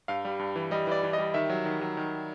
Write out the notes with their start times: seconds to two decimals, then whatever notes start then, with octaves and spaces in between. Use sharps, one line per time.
0.08 G2 F5
0.25 G3
0.39 G2
0.56 E3
0.71 G3 D#5
0.87 E3 D5
1.03 E3
1.13 G3 D#5
1.34 D#3 E5
1.50 F#3
1.65 D#3
1.81 F#3
1.97 D#3